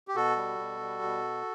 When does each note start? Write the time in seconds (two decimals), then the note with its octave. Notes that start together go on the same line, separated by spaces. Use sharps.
0.08 G4
0.15 B2 F#4 A4
0.37 G3
0.59 B2
0.80 G3
1.02 B2